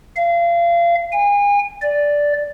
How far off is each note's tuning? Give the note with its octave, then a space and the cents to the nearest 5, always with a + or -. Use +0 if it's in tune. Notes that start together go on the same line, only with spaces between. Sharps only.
F5 -30
G#5 -35
D5 -5